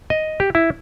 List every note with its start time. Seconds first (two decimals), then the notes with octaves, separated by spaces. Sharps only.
0.10 D#5
0.40 G4
0.55 E4